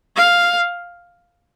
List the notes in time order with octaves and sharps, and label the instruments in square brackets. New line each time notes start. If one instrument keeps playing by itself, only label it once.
[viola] F5